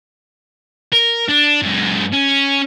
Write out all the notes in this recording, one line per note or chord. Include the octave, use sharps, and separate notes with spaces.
A#4
D4
F#2 G#3
C#4